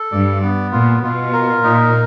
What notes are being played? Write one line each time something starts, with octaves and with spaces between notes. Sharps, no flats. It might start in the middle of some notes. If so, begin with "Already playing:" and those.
Already playing: A4
G2 D5
B3
A#2 F4
B2 F4
A#4
A#2 D#4